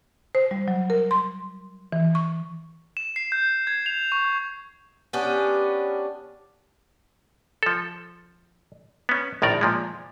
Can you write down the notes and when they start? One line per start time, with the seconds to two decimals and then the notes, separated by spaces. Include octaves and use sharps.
0.35 C5
0.51 G3
0.68 F#3
0.90 A#4
1.11 C6
1.92 E3
2.15 C#6
2.97 E7
3.16 C7
3.32 G6
3.67 G#6
3.86 F7
4.12 C#6
5.13 B3 C#4 D4 G4
7.63 F3 A4
9.09 B3 C#4
9.42 A#1 A2 D#3 A#4 D5
9.61 A#2 F3 G#3